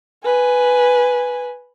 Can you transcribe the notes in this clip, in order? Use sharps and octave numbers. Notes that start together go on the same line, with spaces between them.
B4 G#5